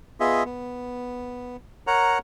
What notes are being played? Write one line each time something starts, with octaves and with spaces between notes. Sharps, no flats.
B3 F4 G#4 D#5 E5
B3
A#4 C#5 F#5 A#5